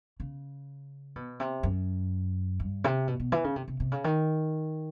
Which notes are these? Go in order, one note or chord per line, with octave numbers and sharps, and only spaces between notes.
C#3
B2
C3
F#2
G2
C3
B2
B2
E3
C#3
C3
C3
C3
C#3
D#3